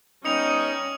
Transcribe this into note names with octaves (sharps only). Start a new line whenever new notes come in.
G3 B3 C#4 D#4 D#6 C#7 F7